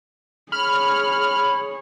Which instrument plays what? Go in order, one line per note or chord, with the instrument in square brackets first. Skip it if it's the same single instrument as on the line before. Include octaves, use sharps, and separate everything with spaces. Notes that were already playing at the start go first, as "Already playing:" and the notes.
[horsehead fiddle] G#4 C#5 [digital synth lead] B5 [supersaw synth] F6